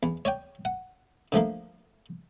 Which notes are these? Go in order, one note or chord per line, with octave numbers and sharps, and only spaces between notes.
E2
C#5 D5 G5
F#5
D3 F3 A3 A#3